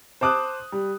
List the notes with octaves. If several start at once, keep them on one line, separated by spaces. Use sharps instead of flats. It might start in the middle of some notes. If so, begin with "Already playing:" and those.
C5 A5 D6 D#6 F#6
G3